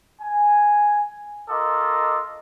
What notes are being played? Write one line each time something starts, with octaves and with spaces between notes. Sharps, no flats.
G#5
F4 A4 A#4 D#5 D6